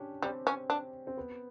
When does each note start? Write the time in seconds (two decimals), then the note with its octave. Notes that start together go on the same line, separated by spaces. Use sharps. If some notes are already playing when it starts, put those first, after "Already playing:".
Already playing: C#4 D4 G4
0.22 G3 C4
0.47 C#4
0.70 D4
1.07 C4
1.17 B3